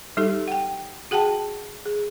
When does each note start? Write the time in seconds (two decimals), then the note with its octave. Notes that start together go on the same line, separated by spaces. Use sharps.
0.17 G3 D#4 G4 A4
0.48 F#5 G5
1.11 F#4 G#4 F#5 G5 A5
1.86 G#4